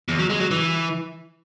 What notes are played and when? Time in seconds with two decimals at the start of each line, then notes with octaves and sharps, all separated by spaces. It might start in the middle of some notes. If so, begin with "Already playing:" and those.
0.08 E2
0.19 F#3
0.30 G#3
0.40 F#3
0.51 E3